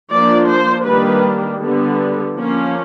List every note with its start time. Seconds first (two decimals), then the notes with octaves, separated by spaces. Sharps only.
0.12 F3 A#3 D4 D5
0.50 C5
0.86 D#3 G3 A#3 D4 B4
1.61 D3 G3 B3
2.35 F3 A#3 C#4